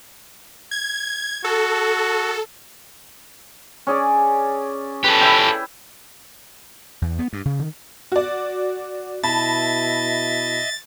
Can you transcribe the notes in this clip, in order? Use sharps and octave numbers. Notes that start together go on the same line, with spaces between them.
G#6
F#4 A4
C#4 G#4 D5
G4 A4 B4
E4 G5
E2
B3
G2
C#3
D#3
F#4 D5
B2 E4 D#5 E5 A5 B5 A6